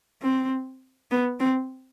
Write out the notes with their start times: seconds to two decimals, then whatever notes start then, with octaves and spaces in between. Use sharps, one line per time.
0.22 C4
1.11 B3
1.40 C4